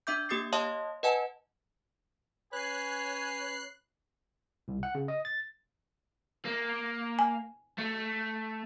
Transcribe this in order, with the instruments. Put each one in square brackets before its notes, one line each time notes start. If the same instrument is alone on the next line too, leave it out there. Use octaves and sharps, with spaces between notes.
[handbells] D4 E5 D6 G6
A#3 G4 D#6 A6 C7
C#5 D#5 F5 A5 C6 D#6
B4 D#5 F#5 G#5 A5
[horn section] C#4 B4 C#5 [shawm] G#5 [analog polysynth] F#6 C7
[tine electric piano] C2
F#5
C#3
D#5
A6
[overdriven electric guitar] A#3
[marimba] G#5
[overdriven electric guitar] A3